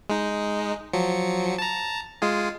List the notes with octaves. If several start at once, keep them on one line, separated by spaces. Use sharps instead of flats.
G#3 D#4
F3 F#3 C#7
A5 A#5
G#3 F4 G#4